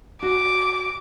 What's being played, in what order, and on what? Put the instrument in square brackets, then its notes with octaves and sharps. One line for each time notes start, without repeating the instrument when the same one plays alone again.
[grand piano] F#4 [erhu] D6